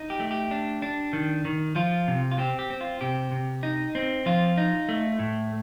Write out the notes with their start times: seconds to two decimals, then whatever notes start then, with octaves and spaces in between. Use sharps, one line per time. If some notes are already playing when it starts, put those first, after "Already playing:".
Already playing: D#4
0.10 G4
0.20 A3
0.31 G4
0.51 D4
0.82 D4
1.13 D#3
1.45 D#3
1.75 F3 F4
2.08 C3
2.32 F4
2.38 C4 G4
2.59 G4
2.70 C4
2.81 F4
3.01 C3 G4
3.32 C3
3.63 D#4
3.95 C4
4.26 F3 F4
4.58 D#4
4.89 A3
5.19 A2